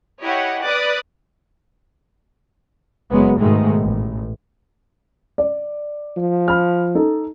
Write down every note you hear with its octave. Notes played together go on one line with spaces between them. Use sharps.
E4 G4 C#5 D#5 F#5
B4 D5 D6 D#6 F#6 A6
F#1 F#2 F#3 G#3 B3
G#2 B2 D#3 G#3 A3
A1
D5
F3
B5 F6
D#4 A4